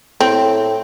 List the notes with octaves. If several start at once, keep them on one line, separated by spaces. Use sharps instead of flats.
A2 C4